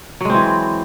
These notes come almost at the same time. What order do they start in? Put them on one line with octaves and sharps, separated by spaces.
F#3 G#3 C4 E3